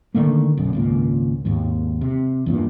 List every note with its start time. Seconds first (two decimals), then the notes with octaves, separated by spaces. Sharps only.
0.14 D3 D#3 A3 A#3
0.57 B1 F#2
0.73 G#1 C#2 A#2
1.45 G#1 D#2 G#2
2.01 C3
2.46 E2 G2 A#2